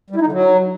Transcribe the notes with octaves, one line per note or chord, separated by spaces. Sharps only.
G3
E4
D#4
D3
F#3